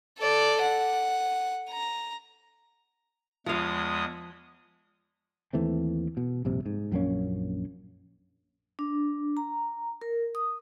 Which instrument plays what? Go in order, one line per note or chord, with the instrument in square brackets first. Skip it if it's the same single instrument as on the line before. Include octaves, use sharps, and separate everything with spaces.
[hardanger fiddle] A4 D5
F#5
A#5
[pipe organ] E2 G#3 D#6 [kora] F3 F5
[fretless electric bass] D#2 E3 A3 C4
B2
A#1 G2 C3
G#2
A#1 F#2 A#3 C#4
[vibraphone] D4
A#5
A#4
D#6